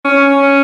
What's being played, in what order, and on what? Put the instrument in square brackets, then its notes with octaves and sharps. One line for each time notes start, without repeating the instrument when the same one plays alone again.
[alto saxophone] C#4